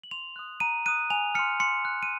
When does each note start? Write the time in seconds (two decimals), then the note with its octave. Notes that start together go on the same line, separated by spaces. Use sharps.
0.04 F#7
0.11 C6 F7
0.36 D#6 F#6
0.60 A#5 D#7
0.86 D#6 F#6 D#7
1.10 G#5 F7
1.35 C6 F6 C#7
1.60 C6 C#7
1.85 F#6
2.03 D#7